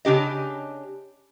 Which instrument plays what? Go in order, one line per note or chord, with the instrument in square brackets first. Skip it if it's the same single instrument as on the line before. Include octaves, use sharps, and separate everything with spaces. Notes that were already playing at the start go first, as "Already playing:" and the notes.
[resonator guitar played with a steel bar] C#3 D4 G4 D#5